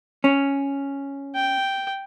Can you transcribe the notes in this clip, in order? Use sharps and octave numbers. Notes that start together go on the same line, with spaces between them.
C#4
G5